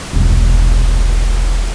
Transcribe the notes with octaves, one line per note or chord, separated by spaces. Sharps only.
E1 C2